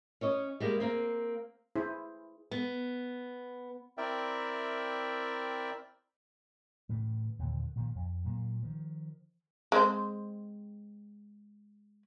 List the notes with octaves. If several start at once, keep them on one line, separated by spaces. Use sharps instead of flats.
C#4 C#5 D#5
G3 G#3 A#3
A#3 C4
E4 G#4 C5
B3
C4 E4 A#4 D5 E5 G5
A2 C#3 E3
D#2 A#2 D3
A#2 D#3 F3
F2
A#2 F#3 A#3
D#3 F3
G#3 C4 C5